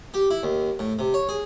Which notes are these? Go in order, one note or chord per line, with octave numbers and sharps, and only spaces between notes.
G4
E4
D#2
A2
C3
C#5
G#4